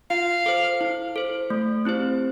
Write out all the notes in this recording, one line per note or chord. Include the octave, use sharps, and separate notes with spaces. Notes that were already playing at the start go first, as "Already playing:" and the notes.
F4 F5
A4 C5
E4
A4 C5
A3
C4 E4 G4 C5